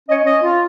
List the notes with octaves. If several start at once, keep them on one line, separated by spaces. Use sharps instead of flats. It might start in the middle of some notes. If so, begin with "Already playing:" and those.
C#4 C#5 D#5
C#4 C#5 D#5
F4